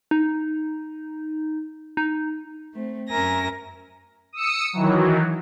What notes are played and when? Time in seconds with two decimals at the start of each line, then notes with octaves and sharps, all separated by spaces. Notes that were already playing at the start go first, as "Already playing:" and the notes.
0.11 D#4
1.97 D#4
2.73 A3 C4
3.09 F#2 C#4 A#4 E5 G#5 A#6
4.33 D#6 E6 C#7
4.73 D#3 E3 F#3